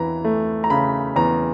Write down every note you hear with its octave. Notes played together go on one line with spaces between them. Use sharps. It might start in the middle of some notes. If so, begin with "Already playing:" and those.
Already playing: E2 E3 A#5
A3
A#5
C#3 B5
E2 A#5